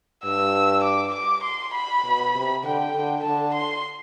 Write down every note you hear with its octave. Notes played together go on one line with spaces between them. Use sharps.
G2 E6
D6
D6
C6
B5
B2
C3
D3 G5
D3
D3 A5
C6